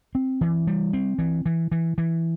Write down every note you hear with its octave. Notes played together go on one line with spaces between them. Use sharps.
C4
E3
G3
C4
E3
E3
E3
E3